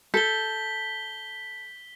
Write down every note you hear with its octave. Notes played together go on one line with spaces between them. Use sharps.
A4 G6 B6 G7